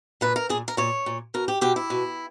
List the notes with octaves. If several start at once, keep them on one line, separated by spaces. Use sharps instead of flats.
A#2 B4
A#4
A#2 G#4
A#4
A#2 C#5
A#2
B2 A#4
G4
B2 G4
E4
B2